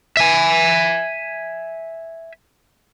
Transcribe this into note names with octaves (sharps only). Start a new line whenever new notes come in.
E5 G#5